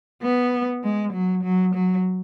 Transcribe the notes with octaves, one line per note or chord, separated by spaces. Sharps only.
B3
G#3
F#3
F#3
F#3